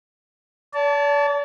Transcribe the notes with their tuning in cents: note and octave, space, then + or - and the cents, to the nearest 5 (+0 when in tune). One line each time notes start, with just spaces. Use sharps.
D5 -45 A5 +0